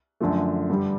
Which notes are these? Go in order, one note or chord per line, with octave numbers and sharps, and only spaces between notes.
F#2 D3 F3 A3
G2 D3 G3